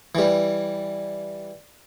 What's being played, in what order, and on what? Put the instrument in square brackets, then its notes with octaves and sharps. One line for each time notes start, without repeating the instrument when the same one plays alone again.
[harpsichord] E3 G3